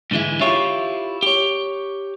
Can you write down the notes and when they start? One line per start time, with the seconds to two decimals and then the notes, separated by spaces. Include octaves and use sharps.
0.11 G#2 D3 E3 G#3 E4
0.41 E4 F4 G4 C#5 E5 F5
1.23 G4 C#5